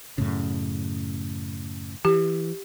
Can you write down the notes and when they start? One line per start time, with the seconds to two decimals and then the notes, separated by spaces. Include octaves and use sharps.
0.18 F#2 A2 C#3
2.05 E3 G4